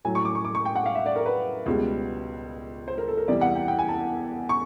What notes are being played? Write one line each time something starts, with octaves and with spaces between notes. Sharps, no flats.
A2 F#3 G#5
C#6
D6
C#6
D6
C#6
G5
F#5
F5
E5
D5
A#4
B4
C#2 B2 G3
C5
A#4
A4
A#4
E2 C3 E3 G3 D5
F#5
G5
G5
G#5
A5
C#6